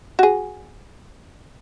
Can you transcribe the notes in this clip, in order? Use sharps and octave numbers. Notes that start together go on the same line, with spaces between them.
F#4 G#4